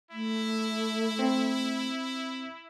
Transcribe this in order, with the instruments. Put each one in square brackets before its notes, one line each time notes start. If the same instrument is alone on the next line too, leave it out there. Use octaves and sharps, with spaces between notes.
[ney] A3 [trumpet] E4
[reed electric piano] C4